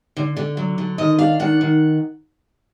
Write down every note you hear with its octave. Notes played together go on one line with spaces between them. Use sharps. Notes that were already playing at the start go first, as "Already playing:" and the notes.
D3
D3
F#3
D3
D#3 D#5
D4 F5
D#3 F#5
D#3